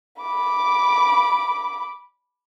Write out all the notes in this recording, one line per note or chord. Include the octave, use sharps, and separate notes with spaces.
B5 D6